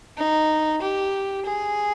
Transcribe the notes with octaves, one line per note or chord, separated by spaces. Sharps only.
D#4
G4
G#4